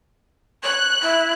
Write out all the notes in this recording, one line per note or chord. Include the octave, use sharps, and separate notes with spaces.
C#5 F#6
E4